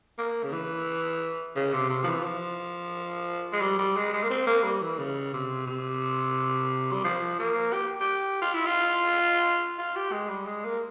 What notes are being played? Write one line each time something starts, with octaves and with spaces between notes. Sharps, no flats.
A#3
C#3
E3
C#3
C3
C3
F3
E3
F3
G#3
G3
G3
G#3
G#3
A#3
C4
A#3
G3
E3
C#3
C3
C3
G3
F3
A#3
G4
G4
F4
E4
F4
F4
G4
G#3
G3
G#3
A#3